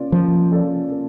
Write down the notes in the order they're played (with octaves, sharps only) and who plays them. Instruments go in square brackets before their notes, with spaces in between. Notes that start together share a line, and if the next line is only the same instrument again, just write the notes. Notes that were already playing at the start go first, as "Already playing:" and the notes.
Already playing: [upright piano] A#3 C#4 F4 D5
[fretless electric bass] F3 [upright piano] A#3
[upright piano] C#4 F4 A4 D5
A#3